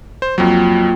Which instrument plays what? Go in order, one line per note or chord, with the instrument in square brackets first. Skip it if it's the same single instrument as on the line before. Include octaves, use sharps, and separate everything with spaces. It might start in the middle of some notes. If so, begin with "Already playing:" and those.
[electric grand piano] C5
[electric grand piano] F2 F#3 [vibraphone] A#3 F4 G5